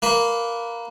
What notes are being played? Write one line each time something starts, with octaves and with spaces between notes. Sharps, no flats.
A#3 B4